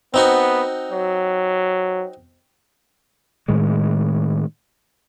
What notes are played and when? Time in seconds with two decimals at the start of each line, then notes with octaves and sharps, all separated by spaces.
0.14 B3 C4 D#4 F#4
0.92 F#3
3.48 A2 D#3 G#3